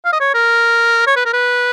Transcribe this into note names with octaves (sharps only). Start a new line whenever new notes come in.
F5
D#5
C#5
A#4
C#5
B4
A#4
B4